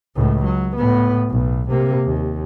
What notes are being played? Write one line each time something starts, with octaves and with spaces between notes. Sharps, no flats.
C#2 A2
F#3
A2 B3
B1
C3 A#3
D#2